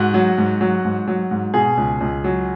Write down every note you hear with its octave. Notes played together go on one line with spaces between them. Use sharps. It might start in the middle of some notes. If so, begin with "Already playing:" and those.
Already playing: G#2 F#4
F#3
G#2
F#3
G#2
F#3
G#2
B2 G#4
C#2
C#2
F#3